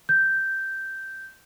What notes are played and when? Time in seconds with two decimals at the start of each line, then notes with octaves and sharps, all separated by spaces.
0.09 G6